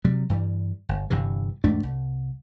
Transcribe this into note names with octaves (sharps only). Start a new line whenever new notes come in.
C3 F#3 G3
G2 E3 G3
G1
G1 G2 C3 E3
E2 G#2 A3 D4
C2